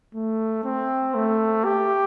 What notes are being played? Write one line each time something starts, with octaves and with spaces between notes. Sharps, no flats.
A3
C4
A3
G4